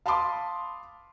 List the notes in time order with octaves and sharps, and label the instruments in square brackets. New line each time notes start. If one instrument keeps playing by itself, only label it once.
[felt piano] F5 A5 B5 C6 D6 D#6